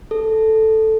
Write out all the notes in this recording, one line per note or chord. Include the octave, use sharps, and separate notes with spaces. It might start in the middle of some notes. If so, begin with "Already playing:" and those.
A4